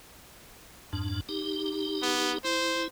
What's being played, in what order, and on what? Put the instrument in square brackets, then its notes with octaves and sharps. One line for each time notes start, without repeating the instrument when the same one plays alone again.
[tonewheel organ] F2 G#2 D4
D#4 G4
[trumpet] B3
[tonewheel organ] E4 [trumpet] C5